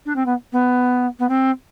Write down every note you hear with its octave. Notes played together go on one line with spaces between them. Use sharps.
D4
C4
B3
B3
B3
C4